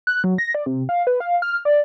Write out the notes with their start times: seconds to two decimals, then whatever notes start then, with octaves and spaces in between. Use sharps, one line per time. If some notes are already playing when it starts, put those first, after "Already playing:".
0.07 F#6
0.24 F#3
0.38 A#6
0.55 D5
0.66 C3
0.89 F5
1.07 B4
1.20 F5
1.42 F6
1.65 D5